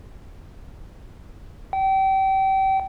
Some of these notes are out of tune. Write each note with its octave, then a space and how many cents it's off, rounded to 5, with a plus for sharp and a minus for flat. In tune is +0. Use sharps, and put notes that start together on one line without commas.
G5 -30